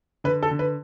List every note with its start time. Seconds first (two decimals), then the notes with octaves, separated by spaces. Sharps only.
0.24 D3 B4
0.43 A4
0.51 D3
0.59 B4